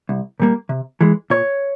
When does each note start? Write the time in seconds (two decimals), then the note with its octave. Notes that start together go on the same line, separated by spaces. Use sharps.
0.09 C2
0.40 A#2 G3 A#3
0.69 C3
1.01 E3 G#3
1.30 A#2 C#5